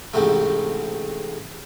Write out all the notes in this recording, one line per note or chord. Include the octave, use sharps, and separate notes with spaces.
A1 G#2 C3 A3